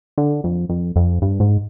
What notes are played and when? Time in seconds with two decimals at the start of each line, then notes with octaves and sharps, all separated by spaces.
0.18 D3
0.44 F2
0.69 F2
0.96 F2
1.22 G2
1.40 G#2